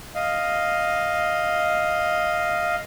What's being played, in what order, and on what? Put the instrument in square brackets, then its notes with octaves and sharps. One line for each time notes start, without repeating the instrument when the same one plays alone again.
[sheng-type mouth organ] D#5 F5